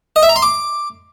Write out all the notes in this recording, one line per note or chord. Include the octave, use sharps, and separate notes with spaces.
D#5
E5
A#5
C6
D6